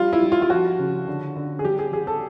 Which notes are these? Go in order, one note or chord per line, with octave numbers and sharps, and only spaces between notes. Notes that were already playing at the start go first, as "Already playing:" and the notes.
Already playing: G3 F4
E4
G3
F4
F4
F3 F#4
C#3
D3
D3
G#4
G3 G4
G#4
G3 G#4
A4